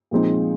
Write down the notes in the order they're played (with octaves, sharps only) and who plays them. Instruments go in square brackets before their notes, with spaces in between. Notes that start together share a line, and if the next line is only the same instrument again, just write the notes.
[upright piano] A#2 F3 G#3 C4 D#4